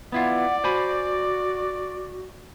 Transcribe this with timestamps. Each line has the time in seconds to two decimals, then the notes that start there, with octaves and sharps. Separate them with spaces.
0.12 B3 E4 F4 D5 F#5
0.64 F#4 C5 G#5 B5